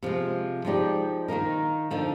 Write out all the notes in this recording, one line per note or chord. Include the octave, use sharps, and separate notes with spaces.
C3 F3 G#3
F3 G#3 D#4 G4 D5
D#3 A#3 D#4 A#4
D3 F3 A#3 D#4